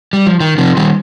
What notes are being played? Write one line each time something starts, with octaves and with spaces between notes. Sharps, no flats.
G3
F3
D#3
C3 F3
D#3 G3